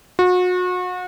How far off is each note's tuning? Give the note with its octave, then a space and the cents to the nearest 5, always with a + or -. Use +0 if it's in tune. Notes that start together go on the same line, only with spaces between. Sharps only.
F#4 -35